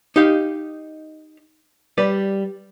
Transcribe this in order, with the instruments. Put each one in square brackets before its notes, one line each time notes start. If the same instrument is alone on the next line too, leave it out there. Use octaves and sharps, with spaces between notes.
[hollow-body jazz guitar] D#4 G4 F5
G3 B4 D5